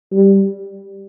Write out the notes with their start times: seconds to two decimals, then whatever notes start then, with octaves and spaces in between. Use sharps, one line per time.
0.12 G3